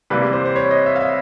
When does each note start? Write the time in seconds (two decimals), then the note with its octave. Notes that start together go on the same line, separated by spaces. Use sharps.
0.10 C3 E3 G3 A#3 B4
0.33 C5
0.45 C5
0.56 C#5
0.71 D#5
0.86 E5
0.96 F5
1.00 E5